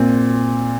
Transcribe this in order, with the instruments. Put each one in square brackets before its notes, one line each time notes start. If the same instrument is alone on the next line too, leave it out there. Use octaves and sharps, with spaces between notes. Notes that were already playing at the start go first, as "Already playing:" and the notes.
Already playing: [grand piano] A#2 C4